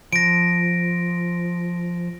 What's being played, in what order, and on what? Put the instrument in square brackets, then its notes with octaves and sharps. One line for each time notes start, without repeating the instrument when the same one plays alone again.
[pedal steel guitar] F3 [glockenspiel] A#6 D7